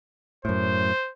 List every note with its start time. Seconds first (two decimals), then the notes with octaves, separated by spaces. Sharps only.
0.45 F#2 A2 C5